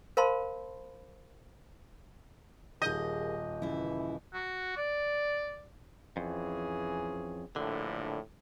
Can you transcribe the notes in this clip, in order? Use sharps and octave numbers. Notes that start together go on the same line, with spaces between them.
A#4 C5 F5 A5 B5 C6
D#1 A#3 G4 G#4 D#5 G6
C#3 E3 E4
F#4
D5
F2 E3 C#4 G#4
A#1 A2 D3